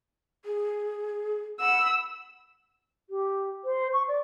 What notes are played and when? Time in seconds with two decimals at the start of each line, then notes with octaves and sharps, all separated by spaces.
0.45 G#4
1.60 F#5 B5 E6
3.09 G4
3.64 C5
3.93 C#6
4.08 D5